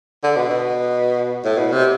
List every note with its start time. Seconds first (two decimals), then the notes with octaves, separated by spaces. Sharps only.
0.23 D3
0.36 B2
0.50 B2
1.45 A2
1.58 B2
1.72 C3